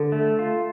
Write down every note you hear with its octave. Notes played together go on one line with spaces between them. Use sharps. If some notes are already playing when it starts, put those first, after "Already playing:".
Already playing: D3 A4
A3
F4